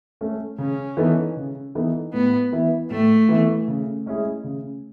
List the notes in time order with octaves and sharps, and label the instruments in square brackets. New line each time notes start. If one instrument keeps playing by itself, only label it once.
[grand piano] A3 C#4
[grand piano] C#3 [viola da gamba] C#4
[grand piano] E3 B3 D#4 A4
C#3
E3 B3 D#4 A4
[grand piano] A2 [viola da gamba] B3
[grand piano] E3 B3 E4
[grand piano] A2 [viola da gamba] A3
[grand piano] E3 B3 E4
C#3
G#3 C#4 E4 G#4
C#3